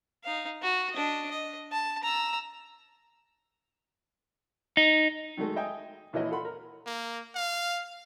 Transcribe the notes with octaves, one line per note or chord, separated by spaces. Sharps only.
D#4 F5
F#4
D4 D#5
D#5
A5
A#5 E6
D#4
D#3 F#3 G#3 A3
D#5 E5 G5 G#5 D#6
A#1 E3 E4 C#5 D#5
F4 A4 F#5 B5 C6
A#4
A#3
F5